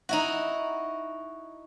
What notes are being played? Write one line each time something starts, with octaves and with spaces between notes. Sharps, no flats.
D#4 E4 F#4